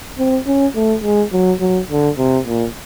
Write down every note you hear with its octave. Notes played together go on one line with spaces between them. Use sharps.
C4
C#4
A3
G#3
F#3
F#3
D3
C3
A#2